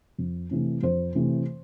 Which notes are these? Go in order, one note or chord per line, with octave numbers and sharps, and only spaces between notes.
F2
C3 E3 A3
F2 C5
C3 E3 A3